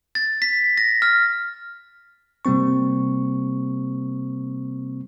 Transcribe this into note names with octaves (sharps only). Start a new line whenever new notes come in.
A6
B6
A#6
F6
C3 G3 A#3 C4 C#6